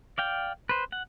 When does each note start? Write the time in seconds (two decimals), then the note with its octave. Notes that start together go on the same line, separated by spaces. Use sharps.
0.18 D5 F5 G5
0.69 B4 C5
0.92 F#5